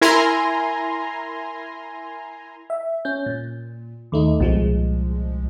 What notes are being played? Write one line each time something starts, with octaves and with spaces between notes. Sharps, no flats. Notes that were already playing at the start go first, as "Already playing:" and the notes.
E4 A#4 G#5 A#5 C6
E5
C#4 G6
A#2
D#2 A3 D#4
C2 A#2 F3 G#3